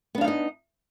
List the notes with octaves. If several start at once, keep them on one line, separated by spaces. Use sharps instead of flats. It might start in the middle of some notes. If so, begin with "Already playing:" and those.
B3 D4 D#4 D#5 F5